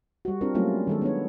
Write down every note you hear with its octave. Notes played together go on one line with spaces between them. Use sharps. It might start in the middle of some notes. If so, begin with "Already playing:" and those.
G3 F#4
C4 D4 F4 A#4
F#3 G3 A3 A#3 C#4 F4
D#3 G#3 A4
B3 D4 C#5